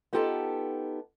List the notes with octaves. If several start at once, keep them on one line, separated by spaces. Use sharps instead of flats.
B3 D#4 F4 G4 A4 A5